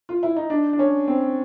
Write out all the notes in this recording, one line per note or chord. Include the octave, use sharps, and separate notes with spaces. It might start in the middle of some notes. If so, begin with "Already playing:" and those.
F4
E4
D#4
D4
D4
C#4
C4